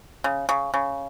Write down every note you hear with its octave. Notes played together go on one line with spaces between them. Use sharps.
C#3
C#3
C#3